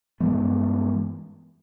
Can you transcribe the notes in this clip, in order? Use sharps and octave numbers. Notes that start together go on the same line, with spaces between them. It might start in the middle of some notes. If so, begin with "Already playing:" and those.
G2 E3 G#3 B3